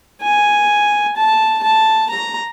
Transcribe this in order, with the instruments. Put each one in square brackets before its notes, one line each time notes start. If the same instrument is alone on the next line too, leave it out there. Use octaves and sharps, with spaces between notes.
[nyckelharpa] G#5
A5
A5
A#5